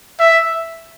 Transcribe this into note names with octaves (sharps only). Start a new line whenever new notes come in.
E5